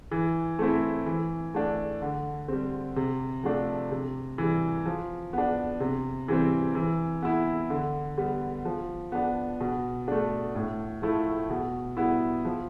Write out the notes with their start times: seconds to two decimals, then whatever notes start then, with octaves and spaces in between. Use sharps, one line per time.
0.11 E3
0.59 A3 C4 E4
1.06 E3
1.54 A3 D4
2.02 D3
2.48 G3 C4
2.96 C3
3.44 F3 A3 D4
3.91 C3
4.38 E3 G3
4.86 F3
5.33 B3 D4
5.80 C3
6.28 E3 G3 C4
6.75 E3
7.22 B3 E4
7.70 D3
8.18 G3 B3
8.65 F3
9.12 B3 D4
9.61 B2
10.08 A3 D4
10.55 A2
11.02 F3 A3 E4
11.50 B2
11.97 G3 B3 E4
12.45 F3